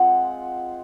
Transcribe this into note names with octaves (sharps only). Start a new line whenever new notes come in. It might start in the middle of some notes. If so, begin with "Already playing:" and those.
Already playing: G#3 C4 F4 F#5